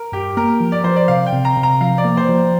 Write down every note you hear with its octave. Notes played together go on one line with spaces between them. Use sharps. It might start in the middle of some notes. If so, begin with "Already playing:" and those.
Already playing: A#4
G2 G4
A#3 A#4
F3
D5
F3 C5
D5
C3 F5
G5
C3
A#5
C3
A#5
F3 F5
D5
A#3
C5
F3